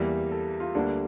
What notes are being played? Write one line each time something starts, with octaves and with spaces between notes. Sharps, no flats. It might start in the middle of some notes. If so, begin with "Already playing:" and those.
Already playing: E2 E3 G3 A#3
A4
F4
D2 D3 G3 A#3 D4